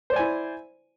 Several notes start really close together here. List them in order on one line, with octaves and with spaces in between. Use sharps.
C5 D5 G#5 E4